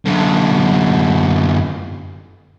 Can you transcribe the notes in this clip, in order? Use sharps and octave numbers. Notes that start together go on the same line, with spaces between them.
F#2 D3